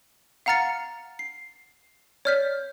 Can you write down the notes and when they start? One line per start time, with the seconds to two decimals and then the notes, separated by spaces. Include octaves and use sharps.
0.46 F5 F#5 A#5 F6 A6 C#7
1.19 C7
2.25 C#5 D5 F6 G6 B6